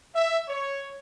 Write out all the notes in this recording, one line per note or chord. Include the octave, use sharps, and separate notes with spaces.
E5
C#5